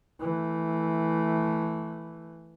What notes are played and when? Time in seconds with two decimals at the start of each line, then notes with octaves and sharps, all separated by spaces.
0.20 E3 A3